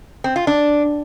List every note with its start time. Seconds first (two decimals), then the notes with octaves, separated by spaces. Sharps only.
0.24 C4
0.36 F4
0.47 D4